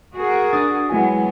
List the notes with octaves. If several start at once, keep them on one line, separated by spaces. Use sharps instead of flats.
F#4 G#4 A#4
D4 D#6 A6
F#3 G#3 B3 E4 G#5